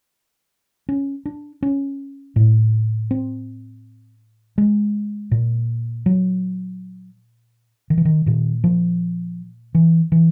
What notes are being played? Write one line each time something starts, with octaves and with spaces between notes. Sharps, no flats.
C#4
D4
C#4
A2
C4
G#3
A#2
F#3
D#3
E3
D#3
A#2 D#3
F3
E3
E3